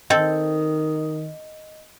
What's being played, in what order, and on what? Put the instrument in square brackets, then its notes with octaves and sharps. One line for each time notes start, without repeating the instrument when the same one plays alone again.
[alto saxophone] D#3 [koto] C4 A4 [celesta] D#5